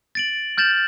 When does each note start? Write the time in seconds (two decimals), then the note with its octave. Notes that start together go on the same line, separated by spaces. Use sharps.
0.15 A6 D7 F#7
0.57 F6 G6 A6 E7 F#7